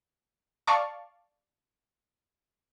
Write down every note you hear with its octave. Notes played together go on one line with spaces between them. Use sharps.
D5 F5 A5 C#6